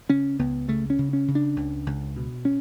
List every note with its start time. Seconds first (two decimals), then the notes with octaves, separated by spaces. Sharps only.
0.09 C#3 C#4
0.39 C#2 B3
0.68 C#3 A3
0.90 C#4
0.99 C#3
1.13 C#4
1.28 C#3
1.35 D4
1.56 C#2
1.86 C#2
2.16 B2
2.45 C#4